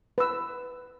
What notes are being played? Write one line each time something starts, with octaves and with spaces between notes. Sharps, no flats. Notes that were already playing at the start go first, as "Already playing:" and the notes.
B4 E6